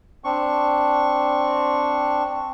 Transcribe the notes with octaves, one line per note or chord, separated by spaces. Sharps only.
C4 D4 C#6